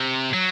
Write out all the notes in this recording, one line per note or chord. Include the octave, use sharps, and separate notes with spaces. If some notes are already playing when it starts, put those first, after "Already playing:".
Already playing: C3
F#3